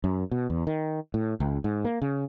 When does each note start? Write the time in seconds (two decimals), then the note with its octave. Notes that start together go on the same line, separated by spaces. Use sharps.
0.04 F#2
0.31 B2
0.50 E2
0.67 D#3
1.14 A2
1.40 C#2
1.64 G#2
1.85 A#3
2.02 C#3